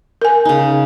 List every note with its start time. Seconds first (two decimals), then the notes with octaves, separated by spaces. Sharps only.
0.22 A#4 G#5
0.45 C#3 D#4